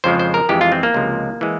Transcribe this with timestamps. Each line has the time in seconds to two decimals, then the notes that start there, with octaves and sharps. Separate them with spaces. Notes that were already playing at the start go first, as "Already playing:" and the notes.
0.04 F2 C#3 F3 G#3 C5
0.19 C5
0.34 A#4
0.49 F2 E3 G#3 G4
0.61 F4
0.72 C4
0.83 A#3
0.94 C#2 C3 F3 G#3
1.41 E3 G#3